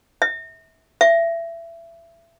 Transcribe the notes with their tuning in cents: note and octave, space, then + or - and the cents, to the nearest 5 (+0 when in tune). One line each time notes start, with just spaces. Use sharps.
E5 -25
E5 +25